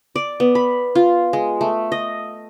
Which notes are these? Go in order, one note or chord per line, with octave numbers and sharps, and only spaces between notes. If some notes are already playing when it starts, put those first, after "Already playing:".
D5
B3
B5
F4
G#3
A3
D#5